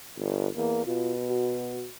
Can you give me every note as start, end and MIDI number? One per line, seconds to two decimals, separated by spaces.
0.17 0.48 31
0.57 0.81 40
0.57 0.83 58
0.86 1.86 47
0.86 1.12 65
1.29 1.89 66